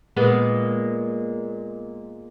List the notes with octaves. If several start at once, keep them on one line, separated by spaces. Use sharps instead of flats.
A#2 G#3 B3